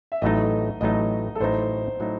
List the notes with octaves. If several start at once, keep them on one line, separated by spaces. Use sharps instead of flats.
E5
A1 A2 F#3 A3 D#4 D#5
A1 A2 F#3 A3 D#4 D#5
A4
A1 A2 F#3 A3 D#4 C5
A2 F#3 A3 D#4